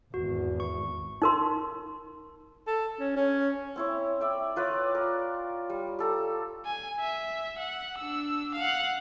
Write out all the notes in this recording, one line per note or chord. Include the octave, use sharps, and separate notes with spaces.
G#1 E2 F#4
C#6
D#4 A#4 C6
A4
C#4
C#4
C4 E4 C#5
D5 E5 G5
F4 B4 C#5 D5
A#4
G3
G4 A4 A#5
G#5
E5
F#5
D4 E6
F5 F#5